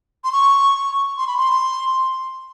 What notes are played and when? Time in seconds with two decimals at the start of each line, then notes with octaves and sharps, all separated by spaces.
0.24 C6
0.33 C#6
1.18 C6
1.27 B5
1.37 C6